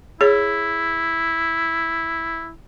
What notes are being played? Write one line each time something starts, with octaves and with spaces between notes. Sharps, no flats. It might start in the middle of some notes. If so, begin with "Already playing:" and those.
E4 G#4 C#5